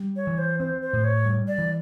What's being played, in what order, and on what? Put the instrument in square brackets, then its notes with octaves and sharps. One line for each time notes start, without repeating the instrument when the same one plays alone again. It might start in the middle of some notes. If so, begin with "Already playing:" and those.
Already playing: [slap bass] G3
[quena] C#5
[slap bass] E3
[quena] C5
[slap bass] C4 [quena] C5
[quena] C5
[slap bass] A2
[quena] C#5
[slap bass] G3
[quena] D5
[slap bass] E3